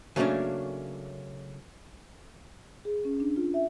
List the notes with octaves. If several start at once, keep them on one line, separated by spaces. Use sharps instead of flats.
C#3 F#3 A3 A#3 C#4 D4
G#4
C#4
D4
F4
E5